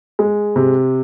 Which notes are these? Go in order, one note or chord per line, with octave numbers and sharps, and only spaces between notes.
G#3
C3